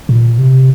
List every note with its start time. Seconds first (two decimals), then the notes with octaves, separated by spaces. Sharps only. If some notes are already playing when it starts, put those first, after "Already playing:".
0.09 A#2
0.39 C3